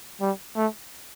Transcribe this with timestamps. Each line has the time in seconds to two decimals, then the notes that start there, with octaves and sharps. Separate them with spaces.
0.21 G3
0.56 A3